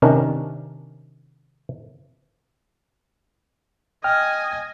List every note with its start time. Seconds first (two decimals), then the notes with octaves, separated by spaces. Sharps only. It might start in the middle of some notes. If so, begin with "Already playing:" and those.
0.02 C3 D#3 C#4 D4 A#4
4.04 D#5 G5 G#5 F6